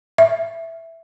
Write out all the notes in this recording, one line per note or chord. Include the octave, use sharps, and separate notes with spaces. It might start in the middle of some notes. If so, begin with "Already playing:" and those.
E5